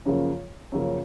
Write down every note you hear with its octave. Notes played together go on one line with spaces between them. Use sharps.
F#2 C#3 F3 A#3
F#2 C#3 F3 A#3